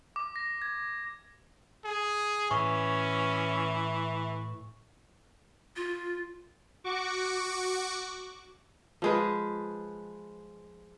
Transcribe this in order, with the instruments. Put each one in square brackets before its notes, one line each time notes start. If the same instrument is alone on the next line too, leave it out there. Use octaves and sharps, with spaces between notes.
[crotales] D6
A#6
G#6
[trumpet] G#4
[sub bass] A2 [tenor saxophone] E3 [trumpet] C#4 [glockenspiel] C#6
[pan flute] F4
[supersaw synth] F#4 C#6 D6
[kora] F3 G#3 B4